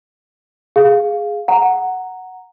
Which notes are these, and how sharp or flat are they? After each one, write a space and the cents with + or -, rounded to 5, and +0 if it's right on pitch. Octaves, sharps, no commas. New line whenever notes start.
G#4 +0 F5 +5
F#5 +0 A#5 -5